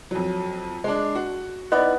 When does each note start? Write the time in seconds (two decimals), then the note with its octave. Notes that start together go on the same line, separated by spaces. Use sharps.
0.11 F2 F#3
0.84 G#3 D4
1.15 F#4
1.72 B3 D#4 E4 D5